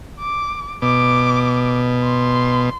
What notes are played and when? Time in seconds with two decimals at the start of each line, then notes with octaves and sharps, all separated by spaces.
0.19 D6
0.82 B2 D6
2.04 C6